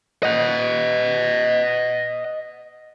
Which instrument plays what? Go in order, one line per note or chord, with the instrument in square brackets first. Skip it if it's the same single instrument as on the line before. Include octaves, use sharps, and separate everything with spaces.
[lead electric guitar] D#5 F#5